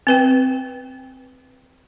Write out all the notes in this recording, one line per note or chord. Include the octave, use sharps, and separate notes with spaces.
C4 B4 G5